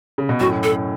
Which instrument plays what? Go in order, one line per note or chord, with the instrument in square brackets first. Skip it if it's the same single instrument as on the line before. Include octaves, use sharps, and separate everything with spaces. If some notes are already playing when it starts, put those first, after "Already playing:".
[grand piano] C#3
B2
[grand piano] F#2 A2 [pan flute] F#4
[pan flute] A4